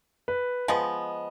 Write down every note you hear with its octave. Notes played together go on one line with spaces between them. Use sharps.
B4
F3 G#3 B3 D#5